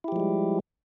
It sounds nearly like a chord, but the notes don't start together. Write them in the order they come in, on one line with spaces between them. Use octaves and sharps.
E4 G4 F3 G#3 G3